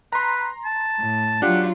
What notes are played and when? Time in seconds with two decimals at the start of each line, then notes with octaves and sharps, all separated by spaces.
0.13 B4 A#5 C6
0.65 A5
0.99 A2
1.42 F#3 D4 F4 G4 F#5